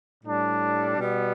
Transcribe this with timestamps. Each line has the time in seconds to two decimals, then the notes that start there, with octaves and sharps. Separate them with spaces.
0.24 A2 G3 D4
0.98 B2 G3 B3